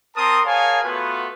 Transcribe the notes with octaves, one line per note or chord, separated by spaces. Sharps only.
C4 A#4 A5 C6 D#6
G#4 A#4 C#5 F5 G#5 A5
A3 B3 F4 F#4 B4